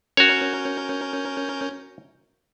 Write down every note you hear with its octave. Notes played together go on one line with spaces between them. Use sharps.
C#4 F#4 A#4 C#5 G6